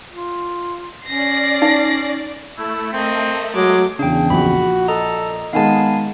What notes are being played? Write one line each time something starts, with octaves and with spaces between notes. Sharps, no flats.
F4
C#4 D5 A#6 C7
D#4
A3 E4
A#3 C4 D#5
F#3 G#3 D6
E2 C#3 C#4 D4 G5
A#1 F#4 B5
A4 D#5 A#5
D#3 G#3 B3 F5 G#5 A5